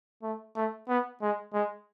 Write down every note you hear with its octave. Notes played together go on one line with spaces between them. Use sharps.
A3
A3
B3
G#3
G#3